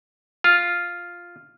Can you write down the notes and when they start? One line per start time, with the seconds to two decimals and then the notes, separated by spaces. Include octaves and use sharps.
0.44 F4